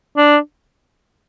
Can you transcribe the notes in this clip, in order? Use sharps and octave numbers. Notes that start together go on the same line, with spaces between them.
D4